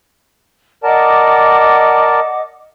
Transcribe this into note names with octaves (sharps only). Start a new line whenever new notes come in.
A#4 D5 D#5 F#5 A5 D6